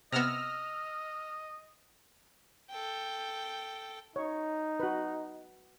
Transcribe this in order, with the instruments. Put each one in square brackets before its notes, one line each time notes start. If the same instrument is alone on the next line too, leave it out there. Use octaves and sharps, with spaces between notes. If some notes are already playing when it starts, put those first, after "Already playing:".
[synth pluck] C3 B3 [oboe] D#5 [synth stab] E6 F6 A#6
[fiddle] A4 G5
[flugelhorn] D#4 [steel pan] C#5
[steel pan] F#4 B4